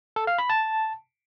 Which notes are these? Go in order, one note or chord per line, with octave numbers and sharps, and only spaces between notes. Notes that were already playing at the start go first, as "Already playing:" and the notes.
A4
F5
B5
A5